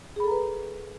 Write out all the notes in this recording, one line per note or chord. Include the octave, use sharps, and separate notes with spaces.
G#4 A4 B4 A#5 B5